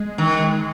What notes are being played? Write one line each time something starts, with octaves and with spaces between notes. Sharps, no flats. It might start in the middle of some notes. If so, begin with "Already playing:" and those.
Already playing: G#3
D#3